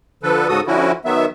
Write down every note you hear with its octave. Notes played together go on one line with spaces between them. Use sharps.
D3 F3 A4 B4
G#2 C#3 F#4 A4 D#6
D3 F3 C#4 E4 F#4
D#3 F#3 B3 E5